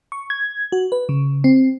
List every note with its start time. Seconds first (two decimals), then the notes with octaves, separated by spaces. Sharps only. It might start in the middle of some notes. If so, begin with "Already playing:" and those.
0.12 C#6
0.30 G#6
0.72 F#4
0.92 B4
1.09 C#3
1.44 C4